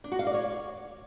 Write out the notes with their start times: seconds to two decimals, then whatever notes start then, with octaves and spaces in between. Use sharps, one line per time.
0.04 D4
0.12 F#4
0.19 F5
0.27 D5
0.34 C#5